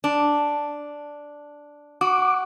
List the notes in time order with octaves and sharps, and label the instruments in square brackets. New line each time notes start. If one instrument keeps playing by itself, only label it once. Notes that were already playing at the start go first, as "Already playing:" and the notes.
[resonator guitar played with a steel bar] D4
[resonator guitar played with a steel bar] F#4 [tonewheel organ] D6